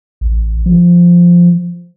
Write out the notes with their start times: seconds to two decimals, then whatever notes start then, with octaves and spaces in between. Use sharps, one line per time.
0.21 A1
0.66 F3